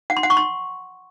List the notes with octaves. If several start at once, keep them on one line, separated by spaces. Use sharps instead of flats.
F#5
C6
F#5
C#6
C6